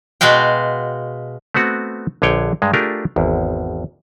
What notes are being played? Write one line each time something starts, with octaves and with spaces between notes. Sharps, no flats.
B2 G#3 F#4 F5 G5
A3 B3 C4 F#4
A#1 D3 G#4 C#5 G5
G2 G#3
A3 D4 F4 G4 G#4 A#4
G#1 E2